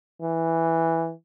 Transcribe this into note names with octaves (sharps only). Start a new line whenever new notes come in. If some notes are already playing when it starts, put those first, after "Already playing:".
E3